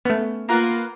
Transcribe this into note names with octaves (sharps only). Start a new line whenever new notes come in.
A3 B3 C#4
A#3 F4 A#4 B4 F#5